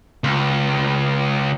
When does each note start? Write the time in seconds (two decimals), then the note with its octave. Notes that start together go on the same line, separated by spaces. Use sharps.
0.24 C#2